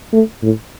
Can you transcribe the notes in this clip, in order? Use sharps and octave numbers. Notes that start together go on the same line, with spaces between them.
A3
A2